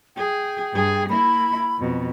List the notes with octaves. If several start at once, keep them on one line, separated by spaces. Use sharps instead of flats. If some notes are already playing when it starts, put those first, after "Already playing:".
G#4 G5
G2 G#4
A#3 E4 B5
F2 B2